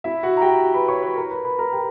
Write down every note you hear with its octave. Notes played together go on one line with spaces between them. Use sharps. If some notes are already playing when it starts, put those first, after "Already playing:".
E4 E5
F#4 F#5
A#5
G4 G5
B4 B5
C#5 C#6
B4 B5
A#4 A#5
B4 B5
B4 B5
A#4 A#5
G4 G5